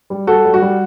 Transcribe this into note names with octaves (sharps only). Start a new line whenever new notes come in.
G3
G3 F#4 A4
G3
F#4
G3